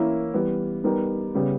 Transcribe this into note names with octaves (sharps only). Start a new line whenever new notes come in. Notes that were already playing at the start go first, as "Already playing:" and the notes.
Already playing: E3 A#3 C#4 E4 A#4
E3 G3 B3
G3 B3 D#4 A#4
C#3 G3 B3